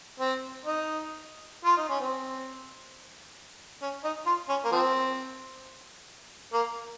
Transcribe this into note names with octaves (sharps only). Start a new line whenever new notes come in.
C4
D#4
F4
D#4
C#4
C4
C#4
D#4
F4
C#4
A#3
F3 C4
A#3